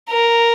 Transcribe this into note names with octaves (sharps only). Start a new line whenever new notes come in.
A#4